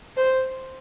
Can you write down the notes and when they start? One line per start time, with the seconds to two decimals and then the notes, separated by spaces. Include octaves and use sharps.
0.17 C5